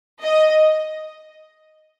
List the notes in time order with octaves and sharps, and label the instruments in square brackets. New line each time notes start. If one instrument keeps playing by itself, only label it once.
[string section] D#5